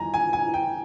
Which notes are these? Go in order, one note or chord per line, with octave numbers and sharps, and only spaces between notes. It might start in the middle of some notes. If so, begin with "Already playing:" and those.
Already playing: E2 D#3 G3 G#5 A#5
G#5
G#5
G5